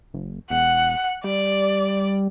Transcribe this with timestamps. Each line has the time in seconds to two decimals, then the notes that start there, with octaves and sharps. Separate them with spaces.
0.14 F#1
0.50 E1 F#5
1.24 G3 D5